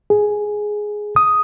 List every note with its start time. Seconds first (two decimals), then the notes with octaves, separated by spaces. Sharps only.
0.10 G#4
1.16 D#6